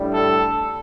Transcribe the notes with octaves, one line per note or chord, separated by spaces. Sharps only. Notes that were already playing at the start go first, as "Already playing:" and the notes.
Already playing: A2 G3 D4
A4